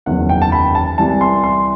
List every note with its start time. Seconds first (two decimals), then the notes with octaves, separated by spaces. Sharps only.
0.06 F#1 E2 D#3 F#3 F#5
0.29 G5
0.42 A5
0.52 B5
0.75 A5
0.98 C2 C3 E3 G3 A5
1.21 C6
1.44 C6